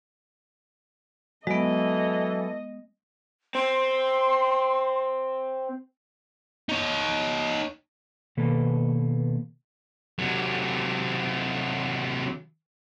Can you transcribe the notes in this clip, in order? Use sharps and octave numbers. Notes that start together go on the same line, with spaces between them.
E3 F#3 G#3 B3 A4 D#5
C4 C6
D#4 C#5
B2 D#3 A#3 A4 B4
C3 F#3